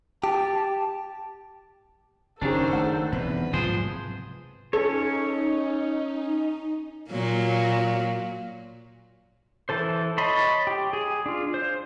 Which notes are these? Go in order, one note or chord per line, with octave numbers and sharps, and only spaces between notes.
G4 A5
F#1 D#3 C#4 D4 G#4 A4 C5
A3 F#5
E2 B2 D#3 C4 B4
G#2 C3 F3 F#3 G#4 C5
C#4 D#4 A4 C#5
A#2 F#3 A#3
E3 A4 C5
C#5 D#5 A5 B5 C6
G4
G#4
D4 F4
C5